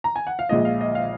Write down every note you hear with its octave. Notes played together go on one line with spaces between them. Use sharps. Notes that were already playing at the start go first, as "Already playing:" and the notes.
A#5
G#5
F#5
F5
A#1 A#2 G#3 D#5
F5
D#5
F5